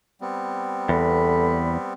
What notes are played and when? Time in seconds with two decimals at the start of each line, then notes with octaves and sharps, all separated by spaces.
0.21 G3 B3 C4
0.89 E2 A4 B5